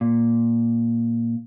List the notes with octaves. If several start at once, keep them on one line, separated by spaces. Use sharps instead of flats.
A#2